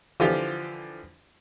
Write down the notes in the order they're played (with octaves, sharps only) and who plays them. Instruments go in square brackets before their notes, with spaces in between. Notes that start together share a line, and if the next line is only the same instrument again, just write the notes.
[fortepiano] D3 E3 F3 F4 G4